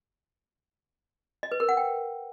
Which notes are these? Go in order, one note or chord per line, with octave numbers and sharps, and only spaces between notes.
D#5
B4
A#4
F#5
G5